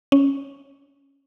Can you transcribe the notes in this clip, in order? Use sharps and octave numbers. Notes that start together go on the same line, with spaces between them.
C#4